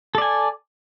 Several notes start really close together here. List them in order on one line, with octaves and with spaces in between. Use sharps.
A4 D5 G#5